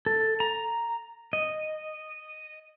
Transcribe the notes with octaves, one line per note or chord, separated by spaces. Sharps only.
A4
A#5
D#5